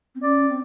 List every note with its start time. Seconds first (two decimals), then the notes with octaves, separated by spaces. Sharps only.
0.15 C4
0.22 C#4 D5
0.49 C4